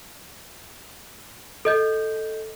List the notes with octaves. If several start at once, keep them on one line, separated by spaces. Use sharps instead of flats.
A4 D#5 G6